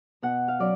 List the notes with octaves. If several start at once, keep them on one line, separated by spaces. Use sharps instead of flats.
B2 F#5
F5
F#3 C#4 D5